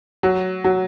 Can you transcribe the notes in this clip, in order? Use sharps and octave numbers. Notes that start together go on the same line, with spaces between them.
F#3
F#3